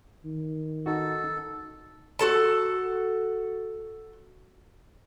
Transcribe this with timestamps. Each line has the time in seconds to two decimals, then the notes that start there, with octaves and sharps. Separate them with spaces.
0.25 D#3
0.86 D#4 F#4 A4
2.19 F#4 A4 A5